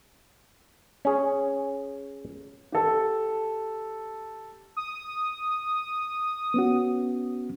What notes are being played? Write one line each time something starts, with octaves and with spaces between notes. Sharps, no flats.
C#4 G#4
G4 A4 A5
D#6
B3 C#4 F#4